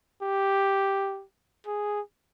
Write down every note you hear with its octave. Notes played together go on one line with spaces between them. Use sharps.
G4
G#4